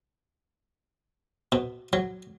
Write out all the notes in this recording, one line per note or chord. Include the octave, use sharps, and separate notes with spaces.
B2
F#3